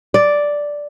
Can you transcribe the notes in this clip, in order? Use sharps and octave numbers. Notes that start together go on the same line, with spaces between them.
D5